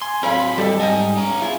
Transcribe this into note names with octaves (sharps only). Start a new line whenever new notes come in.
G#5 C6
F#3 C4 A4 C#5 F5 B5
G3 G4 A4 D5 D#5
G#2 D#4 A4 D#5 G#5
B3 C#4 A#5
E4 F4 G#4